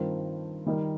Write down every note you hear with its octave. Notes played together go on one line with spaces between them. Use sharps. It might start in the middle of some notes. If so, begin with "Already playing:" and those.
Already playing: G2 D#3 C4 F4 A#4
D#3 G3 D#4 A#4